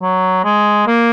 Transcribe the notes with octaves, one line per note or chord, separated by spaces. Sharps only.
F#3
G#3
A#3